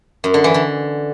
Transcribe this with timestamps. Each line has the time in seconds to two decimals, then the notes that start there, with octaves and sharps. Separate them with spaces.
0.24 F#2
0.34 D3
0.44 E3
0.54 D3